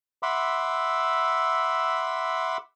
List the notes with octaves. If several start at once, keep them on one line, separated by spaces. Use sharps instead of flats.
E5 F#5 B5 C6 D6 E6